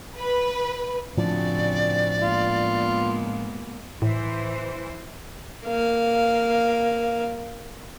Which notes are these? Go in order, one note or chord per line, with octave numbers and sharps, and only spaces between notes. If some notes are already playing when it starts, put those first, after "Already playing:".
B4
A2 C#3 F3 C4 D4 F#4 D5
G#3 A#3 B3 F4
A2 E3 C5
A#3 F5